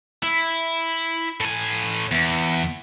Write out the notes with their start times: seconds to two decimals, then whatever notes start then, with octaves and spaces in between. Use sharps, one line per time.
0.23 E4
1.40 A2 G#5
2.12 E2